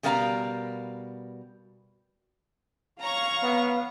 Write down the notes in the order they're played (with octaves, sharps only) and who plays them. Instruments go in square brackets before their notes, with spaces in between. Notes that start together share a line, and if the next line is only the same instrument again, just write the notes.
[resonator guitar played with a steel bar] B2 G3 A#4 F5 A5 A#5
[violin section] C#5 A#5 C#6 [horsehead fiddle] F5
[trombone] B3